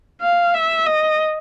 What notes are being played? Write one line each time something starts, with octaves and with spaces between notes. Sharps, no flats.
F5
E5
D#5